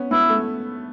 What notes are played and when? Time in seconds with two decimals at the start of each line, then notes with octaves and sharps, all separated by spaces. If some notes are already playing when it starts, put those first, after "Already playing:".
Already playing: B3 C#4
0.11 B3 E4
0.29 A3